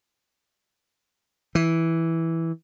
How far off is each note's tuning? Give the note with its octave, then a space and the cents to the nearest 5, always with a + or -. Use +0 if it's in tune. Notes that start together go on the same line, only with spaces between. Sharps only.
E3 -5